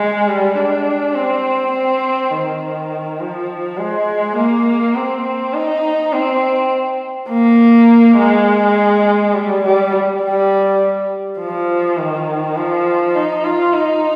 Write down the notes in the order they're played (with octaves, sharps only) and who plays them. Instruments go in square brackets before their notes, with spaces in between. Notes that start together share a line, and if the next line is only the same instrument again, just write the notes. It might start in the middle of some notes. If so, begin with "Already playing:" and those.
Already playing: [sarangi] G#3
G3
D4
C4
C4
D#3
F3
G#3
A#3
C4
D#4
C4
A#3
G#3
G3
G3
G3
F3
D#3
F3
D#4
F4
D#4